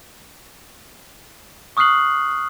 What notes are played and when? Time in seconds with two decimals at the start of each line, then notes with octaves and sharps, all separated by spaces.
1.77 C#6 D#6 F6 F#6 C7 F#7